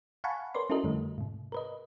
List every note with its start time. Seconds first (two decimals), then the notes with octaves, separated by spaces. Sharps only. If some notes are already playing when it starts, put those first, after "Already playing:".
0.24 F5 F#5 G#5 A5 B5 C#6
0.55 A#4 B4 C#5 D5 C6
0.70 C#4 E4 F#4 A4 A#4 D#5
0.84 F2 D3 G3 A3
1.18 G#2 C3
1.52 A#4 B4 D#5